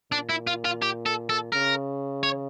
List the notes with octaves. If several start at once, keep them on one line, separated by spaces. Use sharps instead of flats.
A#2 D4
E4
F4
F4
G4
A4
A4
C#3 A#4
C#5